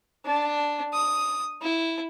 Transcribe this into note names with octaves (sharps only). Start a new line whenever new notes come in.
D4
D#6
E4